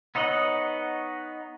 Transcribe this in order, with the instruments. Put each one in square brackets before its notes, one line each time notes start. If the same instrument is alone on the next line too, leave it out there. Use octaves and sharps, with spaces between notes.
[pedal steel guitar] B3 D#4 C#5 D#5 F#5